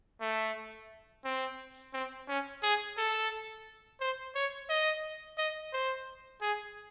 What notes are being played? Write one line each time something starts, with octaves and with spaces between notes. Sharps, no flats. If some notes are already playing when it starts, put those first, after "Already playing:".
A3
C4
C4
C#4
G#4
A4
C5
C#5
D#5
D#5
C5
G#4